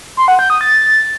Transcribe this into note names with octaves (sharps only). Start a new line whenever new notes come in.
C6
F#5
G6
D#6
A6